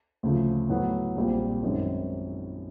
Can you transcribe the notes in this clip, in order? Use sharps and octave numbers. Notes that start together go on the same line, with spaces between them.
D2 C#3 F3
A2 F#3 B3
A#1 A#2 G3 C4 F4
F#2 D#3 G#3 C4